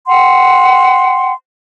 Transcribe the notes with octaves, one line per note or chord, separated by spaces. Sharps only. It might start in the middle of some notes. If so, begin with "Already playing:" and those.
F#5 G5 C6